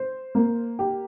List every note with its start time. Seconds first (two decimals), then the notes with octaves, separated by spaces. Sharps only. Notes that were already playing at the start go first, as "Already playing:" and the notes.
Already playing: C5
0.35 A#3
0.79 G4